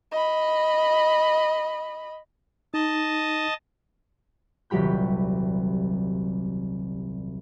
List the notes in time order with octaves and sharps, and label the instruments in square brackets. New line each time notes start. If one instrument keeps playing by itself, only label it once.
[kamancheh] D#5 B5
[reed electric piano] D#4 [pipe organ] D#5 A5
[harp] D#1 C2 F#3 G4 B5 G6